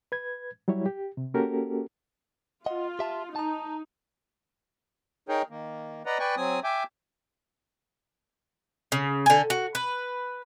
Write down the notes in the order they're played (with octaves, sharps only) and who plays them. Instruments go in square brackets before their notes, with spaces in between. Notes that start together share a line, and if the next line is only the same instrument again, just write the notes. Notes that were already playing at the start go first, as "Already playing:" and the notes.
[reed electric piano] B4 G#6
F#3 G3 E4 C#5
G4
C3
A#3 C#4 F#4 G4 A4 A#4
[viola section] F4 [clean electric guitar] D#5 F#5
[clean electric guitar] G4 E5 A5
[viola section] D#4 [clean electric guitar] A5 A#5
[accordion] D#4 G#4 A#4 C#5 G5
D#3 A#3
B4 D5 D#5 F#5 A#5
B4 D5 G5 G#5 C#6
F#3 C4 G#5 D#6
E5 G5 G#5 D6
[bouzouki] C#3
D3 G#5
F#4
B4